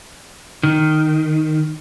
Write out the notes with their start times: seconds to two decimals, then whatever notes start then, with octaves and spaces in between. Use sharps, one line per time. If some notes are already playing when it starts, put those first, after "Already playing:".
0.63 D#3